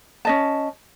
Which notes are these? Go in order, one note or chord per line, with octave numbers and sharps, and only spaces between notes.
C#4 D#5 A5